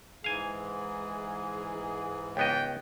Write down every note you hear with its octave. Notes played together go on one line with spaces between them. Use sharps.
G#2 E3 G#4 F5 G#5
C#2 B3 D#5 G5